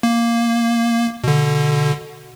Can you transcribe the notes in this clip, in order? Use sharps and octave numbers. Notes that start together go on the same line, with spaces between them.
A#3
B2 D3